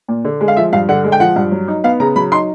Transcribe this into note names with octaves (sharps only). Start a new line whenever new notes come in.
A#2
D3
G#3
F5
F3 E5
G2 F5
D3 F#5
G#3
G5
F3 F#5
G2
F#3
D#4
B3 F5
C#3 A#5
F#3 B5
D#4 C6